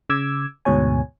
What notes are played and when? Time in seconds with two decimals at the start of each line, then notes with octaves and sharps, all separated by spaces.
0.09 C#3 D6 E6 G#6
0.65 D2 G#2 B2 C#5 G#5